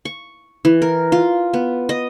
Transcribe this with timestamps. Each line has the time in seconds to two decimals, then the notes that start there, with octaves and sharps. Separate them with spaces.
0.05 C#6
0.65 E3
0.82 A#4
1.12 F4
1.53 B3
1.89 D#5